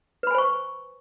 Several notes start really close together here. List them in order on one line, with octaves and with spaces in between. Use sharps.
B4 B5 G#5 C5 C#6